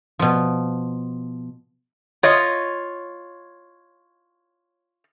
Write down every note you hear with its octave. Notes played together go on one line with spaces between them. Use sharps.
B2 F3
F4 C#5 D#5